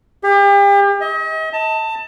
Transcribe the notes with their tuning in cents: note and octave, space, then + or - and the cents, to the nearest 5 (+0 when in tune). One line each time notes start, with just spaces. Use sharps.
G4 +40
D#5 +40
A5 +20